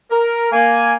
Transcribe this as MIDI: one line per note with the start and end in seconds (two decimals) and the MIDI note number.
0.11 0.50 70
0.52 0.94 58
0.52 0.94 80